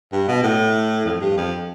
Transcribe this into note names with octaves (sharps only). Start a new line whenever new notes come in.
G2
B2
A2
F2
G2
F2